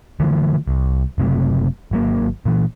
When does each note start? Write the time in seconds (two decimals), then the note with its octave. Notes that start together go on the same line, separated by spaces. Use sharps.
0.20 D3 E3 F3 A3
0.68 C2
1.18 F#1 C3 F#3 A3
1.91 G#1 F#3 A#3
2.45 A#2 E3